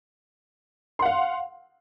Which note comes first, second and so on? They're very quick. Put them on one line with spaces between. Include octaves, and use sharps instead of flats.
C6 F#5 F5